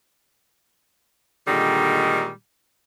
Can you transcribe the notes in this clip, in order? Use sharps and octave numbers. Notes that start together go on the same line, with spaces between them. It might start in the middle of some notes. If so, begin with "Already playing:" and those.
A#2 D3 D#3 G3 G#3